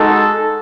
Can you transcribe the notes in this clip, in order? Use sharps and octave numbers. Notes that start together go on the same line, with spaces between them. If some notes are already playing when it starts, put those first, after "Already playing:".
Already playing: G#3 D#4 F#4 A4